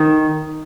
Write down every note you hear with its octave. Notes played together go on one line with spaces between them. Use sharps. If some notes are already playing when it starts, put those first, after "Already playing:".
Already playing: D#3